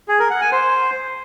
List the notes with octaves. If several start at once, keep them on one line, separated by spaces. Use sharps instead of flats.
G#4
A#4
F#5
G#5
C5